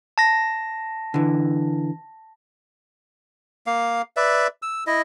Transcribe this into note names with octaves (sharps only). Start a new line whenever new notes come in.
A5 A#6
D3 E3
A#3 F5
B4 D5 E5
E6
E4 D#5